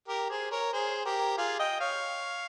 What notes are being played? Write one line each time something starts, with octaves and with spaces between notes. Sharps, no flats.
G4 A#4
G#4 C5
A#4 C#5
G#4 C5
G4 A#4
F4 G#4
D#5 G5
C#5 F5